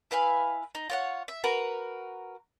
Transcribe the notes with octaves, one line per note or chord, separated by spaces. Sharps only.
E4 B4 F5 G#5
D#4
F4 C#5 F#5
E5
F#4 A#4 B4 A#5